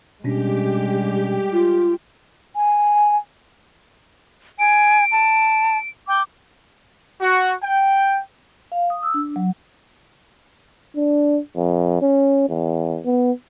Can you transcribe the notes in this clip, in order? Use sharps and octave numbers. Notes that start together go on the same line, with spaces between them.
B2 G3 G#3 C#4 D4 G4
F4
G#5
G#5 D7
A5
G5 D6
F#4
G5
F5
D#6
E6
D4
F#3
D4
F2
C#4
E2
B3